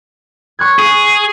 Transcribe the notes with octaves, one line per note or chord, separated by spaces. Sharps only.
C#6 F#6 G#6
G#4